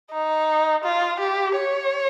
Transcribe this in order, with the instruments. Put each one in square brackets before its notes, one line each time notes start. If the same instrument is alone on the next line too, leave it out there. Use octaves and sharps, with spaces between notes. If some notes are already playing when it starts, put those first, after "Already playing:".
[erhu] D#4
F4
G4
C#5